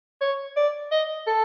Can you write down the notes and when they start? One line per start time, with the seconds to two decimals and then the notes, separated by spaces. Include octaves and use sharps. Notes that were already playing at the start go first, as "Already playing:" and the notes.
0.21 C#5
0.57 D5
0.92 D#5
1.27 A4